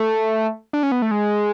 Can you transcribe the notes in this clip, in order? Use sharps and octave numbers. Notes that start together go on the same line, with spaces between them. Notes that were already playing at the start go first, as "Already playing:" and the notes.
Already playing: A3
D4
C#4
B3
A3
G#3